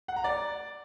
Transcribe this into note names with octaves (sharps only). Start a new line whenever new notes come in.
F#5
A#5
D5